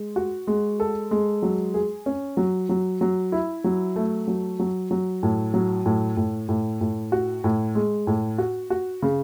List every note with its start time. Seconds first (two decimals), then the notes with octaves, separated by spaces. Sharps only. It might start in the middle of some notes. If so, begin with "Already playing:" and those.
Already playing: G#3
0.16 F#4
0.47 G#3
0.80 A4
1.11 G#3
1.43 F#3
1.74 G#4
2.06 C#4
2.37 F#3
2.69 F#3
3.01 F#3
3.32 E4
3.64 F#3
3.96 A3
4.27 F#3
4.59 F#3
4.91 F#3
5.23 A2
5.54 F#3
5.86 A2
6.17 A2
6.49 A2
6.81 A2
7.12 F#4
7.44 A2
7.75 G#3
8.07 A2
8.38 F#4
8.70 F#4
9.02 C#3